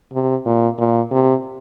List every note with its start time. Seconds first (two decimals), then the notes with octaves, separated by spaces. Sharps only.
0.13 C3
0.45 A#2
0.78 A#2
1.11 C3